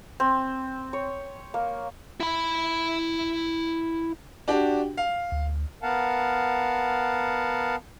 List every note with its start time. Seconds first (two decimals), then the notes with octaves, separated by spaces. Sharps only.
0.20 C4
0.93 C#5
1.54 A#3
2.20 E4 B5
4.48 D4 F#4 G4
4.97 F5
5.32 D2
5.83 B3 A#4 F5 F#5 A5